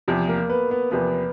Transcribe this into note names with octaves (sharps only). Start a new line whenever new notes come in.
E2 C3 F3
A#3 A#4
B3 B4
B3 B4
E2 C3 F3 B3 B4